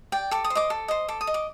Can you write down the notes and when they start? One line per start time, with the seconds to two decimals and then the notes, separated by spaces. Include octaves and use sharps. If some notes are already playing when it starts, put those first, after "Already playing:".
0.12 D5 G5
0.31 A4 D6
0.44 D#6
0.50 C5
0.55 D#5 D6
0.70 A4
0.88 C5 D#5
1.08 A4 D6
1.21 D#6
1.27 D#5
1.34 D6